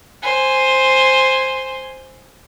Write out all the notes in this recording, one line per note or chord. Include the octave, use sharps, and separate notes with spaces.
C5 G#5